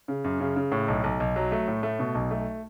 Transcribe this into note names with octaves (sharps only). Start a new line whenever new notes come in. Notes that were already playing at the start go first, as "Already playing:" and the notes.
C#3
F#2
C#3
C#3
A2
B1
B1
B1
F#3
A3
A2
A3
B2
B1
A3